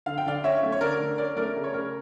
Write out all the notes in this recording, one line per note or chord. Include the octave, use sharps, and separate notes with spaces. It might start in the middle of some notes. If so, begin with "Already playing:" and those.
D3 F5
G5
D3 D5 F5
C#4 C#5 E5
A3
C#5
D3 A#4 D5
D3
C#4 A#4 D5
A3 A#4 D5
C#3
C#5
C#3 A#4